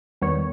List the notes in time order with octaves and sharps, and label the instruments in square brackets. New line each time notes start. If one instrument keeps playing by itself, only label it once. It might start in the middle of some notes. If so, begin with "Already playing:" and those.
[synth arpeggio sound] E2 D#3 G3 B3 C#5